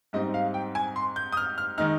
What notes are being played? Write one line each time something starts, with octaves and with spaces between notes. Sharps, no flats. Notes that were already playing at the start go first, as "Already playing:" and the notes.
G#2 G3 C4 D#4 D#5
F5
G5
G#5
C6
G6
D#6
F6
F6
D#3 G#3 D#4 F6